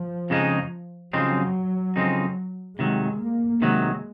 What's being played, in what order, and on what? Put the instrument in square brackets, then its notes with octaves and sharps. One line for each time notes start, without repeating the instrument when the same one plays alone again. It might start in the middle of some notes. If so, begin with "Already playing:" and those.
Already playing: [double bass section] F3
[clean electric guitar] F2 C#3 G#3 C4 D#4
[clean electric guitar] F2 C#3 G#3 C4 D#4 [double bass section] F#3
[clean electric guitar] F2 C#3 G#3 C4 D#4
[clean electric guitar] C3 D#3 F#3 [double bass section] G#3
[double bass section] A#3
[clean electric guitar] C3 D#3 F#3 [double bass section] G#3